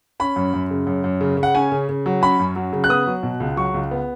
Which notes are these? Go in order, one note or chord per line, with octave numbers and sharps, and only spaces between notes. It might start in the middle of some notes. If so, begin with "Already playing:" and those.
C#4 B5
F#2
F#2
C#3
F#2
F#2
C#3
C#3
F#5
C#4 G#5
C#3
C#3
F#3
C#4 B5
F#2
F#3
C#3
F#6
B3 D#6
F#3
B2
C#2
F#3 C#6
C#2
B3